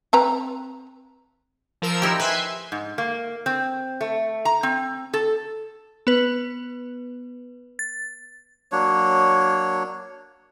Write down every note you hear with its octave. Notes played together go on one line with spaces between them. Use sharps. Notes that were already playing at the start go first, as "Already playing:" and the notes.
C4 B4 A#5
F3 A#4 E6
D#4 E4 G4
B4 E5 G#5 C6
G#2
A#3
C4
A3
A#5
C4
A4
B3 B4
A6
F#3 A#3 D4 C#5